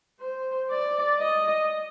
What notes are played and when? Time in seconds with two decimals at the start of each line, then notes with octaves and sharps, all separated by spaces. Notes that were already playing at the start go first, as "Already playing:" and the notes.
0.21 C5
0.70 D5
1.19 D#5